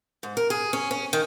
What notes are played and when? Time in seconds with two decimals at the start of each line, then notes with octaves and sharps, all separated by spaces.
0.23 G#2
0.37 A#4
0.50 G#4
0.73 C#4
0.91 C#4
1.13 D#3